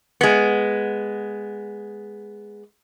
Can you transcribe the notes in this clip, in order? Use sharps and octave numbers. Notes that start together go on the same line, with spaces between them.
G#3 B3